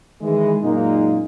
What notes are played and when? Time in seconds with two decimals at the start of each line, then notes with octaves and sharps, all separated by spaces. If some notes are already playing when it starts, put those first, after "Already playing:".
0.21 D#3 E3 G#3
0.61 F#2 A#2 G#3 A#3 D#4